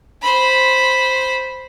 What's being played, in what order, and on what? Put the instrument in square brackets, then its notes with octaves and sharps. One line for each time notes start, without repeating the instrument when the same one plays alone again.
[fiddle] C5 B5